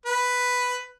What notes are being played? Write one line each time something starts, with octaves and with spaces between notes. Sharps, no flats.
B4